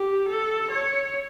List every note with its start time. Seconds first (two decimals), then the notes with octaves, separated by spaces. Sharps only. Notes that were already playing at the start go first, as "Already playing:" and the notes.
Already playing: G4
0.28 A4
0.71 C#5